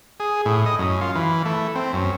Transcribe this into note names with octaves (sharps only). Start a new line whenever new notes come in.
G#4
A2
D#5
F#2
F4
E3
A3
C4
F#2